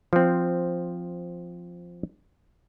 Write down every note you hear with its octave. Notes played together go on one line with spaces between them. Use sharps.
F3 C4